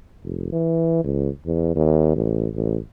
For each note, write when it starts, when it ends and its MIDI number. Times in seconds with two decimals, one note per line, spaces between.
0.24 0.51 29
0.53 1.04 52
1.04 1.29 37
1.46 1.75 40
1.76 2.14 39
2.16 2.48 33
2.54 2.77 33